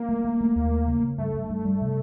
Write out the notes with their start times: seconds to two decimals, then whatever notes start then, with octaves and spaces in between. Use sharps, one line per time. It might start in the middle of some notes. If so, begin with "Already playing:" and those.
Already playing: A#3
0.09 A3
0.25 A3
0.41 A3
0.56 D#2
0.71 A3
0.87 C#3
1.03 C#3
1.18 G2 A3
1.34 G2
1.50 G2
1.65 G3
1.82 C3